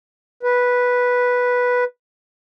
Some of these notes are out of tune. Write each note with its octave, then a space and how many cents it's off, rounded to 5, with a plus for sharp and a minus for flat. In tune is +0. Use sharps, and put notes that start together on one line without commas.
B4 -5